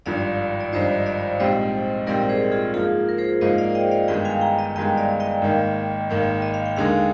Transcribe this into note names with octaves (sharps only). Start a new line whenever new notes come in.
G#1 G2 F3 D5 F5
D5
G#1 G2 F3 C5 D#5
D5 F5
A#1 G#2 G3 C4 G4 C5 D#5
A#1 G#2 G3 C4 G4 A#4 D5
G#4 C5
F4 G#4
G#2 F3 A#3 F4 G#4
A#4
G#4 C5
G#2 F3 A#3 C5 D#5
D5 F5
D#5 G5
D5 F5
G1 G2 D#3 G#3 D#5 G5
F5 G#5
G5 A#5
D#5 G5
G1 G2 D#3 G#3 D#5 G5
D5 F5
D#5 G5
G#1 G#2 D#3 A#3
G#1 G#2 D#3 A#3
D#5
F5
G5
D#2 D3 G#3 D#4 A#4 F5 G#5